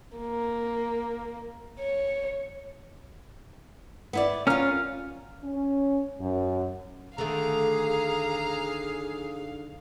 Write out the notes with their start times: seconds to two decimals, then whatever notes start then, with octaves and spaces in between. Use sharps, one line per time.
0.17 A#3
1.79 C#5
4.13 B3 E4 D5
4.47 C#4 F4 A#4 F6
5.44 C#4
6.20 F#2
7.18 D3 D#3 A3 G#4 F5 A#5